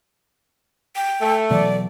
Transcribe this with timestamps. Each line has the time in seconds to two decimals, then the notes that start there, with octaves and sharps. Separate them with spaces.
0.96 G5
1.20 A3
1.50 B2 E3 F#3 D5